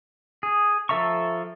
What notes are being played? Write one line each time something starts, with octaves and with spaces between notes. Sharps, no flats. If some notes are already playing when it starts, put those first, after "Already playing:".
G#4
F3 A4 E5 A#5 C#6